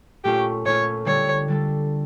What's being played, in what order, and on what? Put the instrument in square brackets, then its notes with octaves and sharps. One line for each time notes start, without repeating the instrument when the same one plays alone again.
[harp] A#2 A3 C#4 F4 [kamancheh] G4
[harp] A#2 A3 C#4 F4 [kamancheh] C#5
[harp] D3 G3 D4 A4 [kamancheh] C#5
[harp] D3 G3 D4 A4